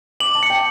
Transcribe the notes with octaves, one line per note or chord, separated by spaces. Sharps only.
D6 F#7
A5
C#7
G5